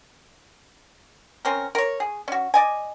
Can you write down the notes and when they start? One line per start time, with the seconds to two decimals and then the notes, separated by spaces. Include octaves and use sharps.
1.45 C4 C#4 A#4
1.75 A#4 C#5
2.00 G#4
2.28 C#4 F#4
2.54 D5 D#5 G#5